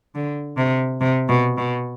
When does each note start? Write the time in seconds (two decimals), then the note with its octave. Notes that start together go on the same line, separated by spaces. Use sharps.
0.15 D3
0.57 C3
1.01 C3
1.29 B2
1.57 B2